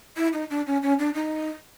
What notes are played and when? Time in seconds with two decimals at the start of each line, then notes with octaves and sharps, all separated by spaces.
0.17 E4
0.33 D#4
0.50 D4
0.66 C#4
0.83 C#4
0.99 D4
1.14 D#4